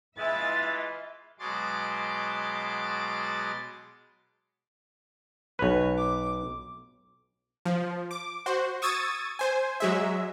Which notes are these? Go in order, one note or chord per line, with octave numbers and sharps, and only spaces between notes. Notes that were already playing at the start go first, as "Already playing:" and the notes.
E3 G#3 F4 E5 A6
B2 F#3 G#3 C6 D6 A6
B1 B4 C#5
D6
F3
D6
F#4 C5
C#6 D#6 E6 G#6 A6 D#7
C5 G#5
F#3 G#3 E5